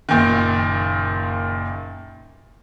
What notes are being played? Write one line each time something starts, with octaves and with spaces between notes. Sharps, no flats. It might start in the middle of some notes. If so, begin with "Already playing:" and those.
F#1 A#2 D#3